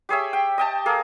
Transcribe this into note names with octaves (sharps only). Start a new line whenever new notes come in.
G4 G#4 C#5 E5
G5
D#5 G5 A5
A#3 G#4 A4